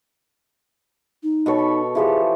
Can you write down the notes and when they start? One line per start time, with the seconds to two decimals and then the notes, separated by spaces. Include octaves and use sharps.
1.23 D#4
1.46 B2 A4 C#5
1.58 B5
1.95 E3 F3 G4 G#4